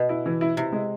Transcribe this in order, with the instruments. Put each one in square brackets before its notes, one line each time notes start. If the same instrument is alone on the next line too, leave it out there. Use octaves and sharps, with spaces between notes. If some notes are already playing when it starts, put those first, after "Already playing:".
Already playing: [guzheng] B2
[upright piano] E4
E3
E4
[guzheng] C3 [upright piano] E4
[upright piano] G#3